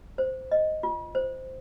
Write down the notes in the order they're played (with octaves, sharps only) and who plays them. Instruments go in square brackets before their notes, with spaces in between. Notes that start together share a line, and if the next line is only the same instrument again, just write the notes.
[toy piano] C5
D#5
F4
C5